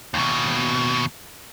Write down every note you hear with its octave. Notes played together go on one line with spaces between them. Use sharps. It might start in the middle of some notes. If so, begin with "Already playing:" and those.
D#2 B2